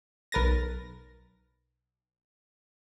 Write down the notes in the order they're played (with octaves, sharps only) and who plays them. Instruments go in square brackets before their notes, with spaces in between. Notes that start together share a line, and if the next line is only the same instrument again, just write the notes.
[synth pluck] B1 A#4 B4 A6 A#6